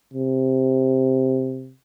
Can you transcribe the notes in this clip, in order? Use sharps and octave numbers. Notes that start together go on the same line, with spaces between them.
C3